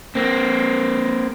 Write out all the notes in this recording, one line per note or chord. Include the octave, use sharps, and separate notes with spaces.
A#3 C4